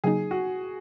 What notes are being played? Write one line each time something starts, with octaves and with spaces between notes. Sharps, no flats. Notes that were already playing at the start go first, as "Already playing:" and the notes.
C#3 F#3 A#3 D#4 G#4
F#4